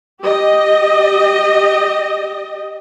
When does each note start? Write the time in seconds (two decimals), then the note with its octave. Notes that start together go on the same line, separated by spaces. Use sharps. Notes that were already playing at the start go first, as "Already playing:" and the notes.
0.22 G4 D#5